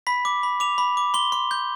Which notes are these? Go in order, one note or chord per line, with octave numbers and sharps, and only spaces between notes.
B5 B6
D6
B5
D6 F7
B5
D6
C6 G7
C6
G6